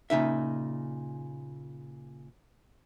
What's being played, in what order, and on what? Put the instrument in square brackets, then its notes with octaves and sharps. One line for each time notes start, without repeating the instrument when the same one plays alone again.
[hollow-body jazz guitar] A#2 C#3 D#4 E5